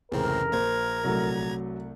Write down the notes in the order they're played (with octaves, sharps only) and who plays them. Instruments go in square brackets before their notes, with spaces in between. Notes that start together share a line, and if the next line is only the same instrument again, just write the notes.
[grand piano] F1 C#3 E3 [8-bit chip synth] C#2 A2 C4 [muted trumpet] A#4
[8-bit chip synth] A#1 A#5 G#6 [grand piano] A#3 C5
[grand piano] C2 A3 [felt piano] F#3